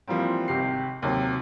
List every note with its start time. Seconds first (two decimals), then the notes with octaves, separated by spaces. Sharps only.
0.08 E3 F3 G3 A#3 C4
0.48 G#1 C3 G4 C7
1.02 D#2 C3 F#3